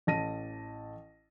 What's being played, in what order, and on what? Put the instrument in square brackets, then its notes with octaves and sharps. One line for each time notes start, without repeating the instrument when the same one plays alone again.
[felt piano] A1 A5 A#6 D#7